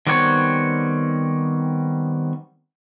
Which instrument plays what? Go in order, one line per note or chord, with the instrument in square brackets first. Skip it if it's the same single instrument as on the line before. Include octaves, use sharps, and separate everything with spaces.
[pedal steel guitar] D#3 G3 B3 C4 C#5